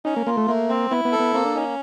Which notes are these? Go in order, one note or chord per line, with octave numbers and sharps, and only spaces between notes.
C#4 D#4
A#3
A#3 F4
A3
A3 A#3
C4
B3 E4
B3
A4
B3
A#3 C4
D4
C#4 D#4